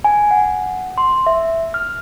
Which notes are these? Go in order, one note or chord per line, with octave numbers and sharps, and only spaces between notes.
G#5
F#5
C6
E5
F6